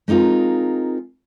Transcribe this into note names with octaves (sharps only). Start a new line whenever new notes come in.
G#3 C4 D#4 F4 A#4